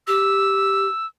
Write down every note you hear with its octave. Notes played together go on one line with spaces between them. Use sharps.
G4 E6